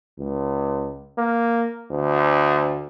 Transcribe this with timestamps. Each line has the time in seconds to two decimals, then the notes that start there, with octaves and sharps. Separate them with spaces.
0.18 C#2
1.17 A#3
1.91 D2